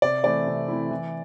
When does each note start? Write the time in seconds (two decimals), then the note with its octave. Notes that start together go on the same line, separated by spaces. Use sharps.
0.02 C3 D5
0.24 E3 A3 C4 E4 D5
0.47 C3
0.68 E3 A3 C4 E4
0.91 E3